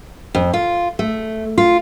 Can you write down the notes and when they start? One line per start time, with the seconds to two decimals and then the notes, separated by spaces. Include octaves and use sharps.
0.35 F2
0.54 F4
0.99 A3
1.58 F4